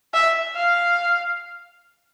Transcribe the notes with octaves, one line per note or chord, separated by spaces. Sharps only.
E5
F5